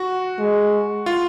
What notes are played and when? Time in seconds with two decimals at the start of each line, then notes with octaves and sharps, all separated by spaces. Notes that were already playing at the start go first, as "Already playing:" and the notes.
Already playing: F#4
0.39 G#3
1.06 F4